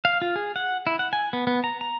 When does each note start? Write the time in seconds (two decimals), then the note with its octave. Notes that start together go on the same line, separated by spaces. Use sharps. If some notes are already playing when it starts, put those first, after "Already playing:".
0.05 F5
0.22 F4
0.36 G#4
0.56 F#5
0.87 E4
0.99 F#5
1.13 G#5
1.33 B3
1.47 B3
1.64 A#5
1.81 A#5